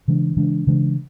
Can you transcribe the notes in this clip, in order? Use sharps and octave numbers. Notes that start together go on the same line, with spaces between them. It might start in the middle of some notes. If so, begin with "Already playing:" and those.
C#3 E3 G#3 D4
C#3 E3 G#3 D4
C#3 E3 G#3 D4